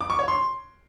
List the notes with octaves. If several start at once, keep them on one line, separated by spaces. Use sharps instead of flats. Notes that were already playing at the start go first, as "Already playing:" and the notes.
D6
C#6
C#5
C6